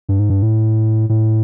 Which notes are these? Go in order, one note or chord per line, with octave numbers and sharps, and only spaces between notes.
G2
G#2
G2
A2
A2